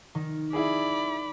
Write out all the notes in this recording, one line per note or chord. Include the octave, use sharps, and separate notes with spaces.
D#3
E4 G#4 D5 B5